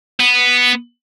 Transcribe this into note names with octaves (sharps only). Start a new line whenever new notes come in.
B3